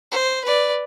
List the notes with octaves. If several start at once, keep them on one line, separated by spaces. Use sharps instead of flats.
C5
B4 D5